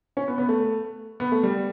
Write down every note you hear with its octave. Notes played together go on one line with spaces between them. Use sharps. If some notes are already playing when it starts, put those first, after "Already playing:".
C#4
B3
B3
A3
B3
A3
G3